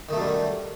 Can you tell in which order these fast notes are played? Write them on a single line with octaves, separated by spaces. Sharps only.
D#3 A3 F#2 G3